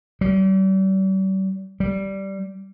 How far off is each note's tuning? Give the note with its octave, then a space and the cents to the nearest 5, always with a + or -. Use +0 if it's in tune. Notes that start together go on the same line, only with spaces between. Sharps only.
G3 -40
G3 -10